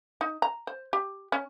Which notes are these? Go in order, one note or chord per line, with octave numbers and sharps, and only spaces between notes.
D#4
A#5
C5
G4
C#4